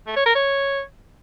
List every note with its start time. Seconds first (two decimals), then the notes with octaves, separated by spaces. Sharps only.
0.07 A3
0.16 C#5
0.26 A#4
0.35 C#5